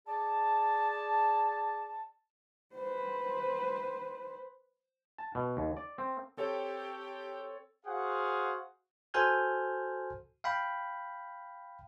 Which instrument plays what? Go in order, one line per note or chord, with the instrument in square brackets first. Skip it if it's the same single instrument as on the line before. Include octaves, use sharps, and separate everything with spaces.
[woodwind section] G#4 D5 A5
[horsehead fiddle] B4 C5
[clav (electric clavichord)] A5
B2
D#2
D5
C4
[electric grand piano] C4 A4 C#5 [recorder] G4
[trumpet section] F#4 G#4 C5 F5 F#5
[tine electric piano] F#4 A4 C5 G#5 F6 G6
F5 G5 B5